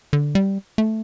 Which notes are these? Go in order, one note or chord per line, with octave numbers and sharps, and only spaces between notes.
D3
G3
A3